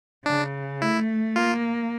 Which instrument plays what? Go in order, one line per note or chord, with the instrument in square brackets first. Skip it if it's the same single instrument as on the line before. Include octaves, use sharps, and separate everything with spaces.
[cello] C#3 [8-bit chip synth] D4
[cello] A3 [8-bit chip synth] E4
[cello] A#3 [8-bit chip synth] F4